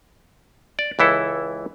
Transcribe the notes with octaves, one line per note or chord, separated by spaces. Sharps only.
D5
C#2 E3 E4 A4